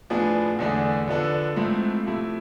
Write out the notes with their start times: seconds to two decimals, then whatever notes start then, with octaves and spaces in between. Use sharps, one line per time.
0.10 A2 F3 B3 D4 G#4
0.59 E2 D3 A3 D4 G#4
1.08 D3 F3 B3 D4 A4
1.56 G#2 F3 A3 C4 E4
2.06 C3 F3 A3 E4